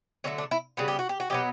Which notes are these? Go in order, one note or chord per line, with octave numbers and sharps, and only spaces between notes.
D3 F#3 A3 C#4
D4
E4
C#3 G3 B3 F#4
G4
F#4
G4
F#4
B2 F#3 B3 G4